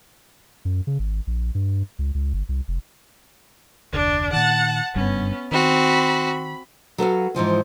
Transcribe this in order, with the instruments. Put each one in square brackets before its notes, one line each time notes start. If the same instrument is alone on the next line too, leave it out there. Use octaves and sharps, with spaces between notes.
[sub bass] F#2
C#3
G#1
A#1
G2
C#2
C#2
G1
C2
F1
[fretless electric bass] F1 D2 [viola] D4
[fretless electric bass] A#2 D#3 [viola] F#5 A5
[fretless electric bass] F#1 G2 [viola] B3 C#4
[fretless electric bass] D#3 [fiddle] C4 F#4 [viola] B5
[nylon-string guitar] F#3 A4 B4 F5
G#2 E3 F3 F4